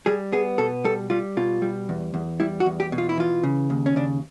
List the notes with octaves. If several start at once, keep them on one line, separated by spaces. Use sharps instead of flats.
G3 G#4
B3 G#4
B2 A4
G3 A4
G3 F4
B2 F4
G3
E2
E2
G3 E4
F#4
E2
G4
B2
F4
E4
E3 F4
C#3
D#2
C#4
C#3 D4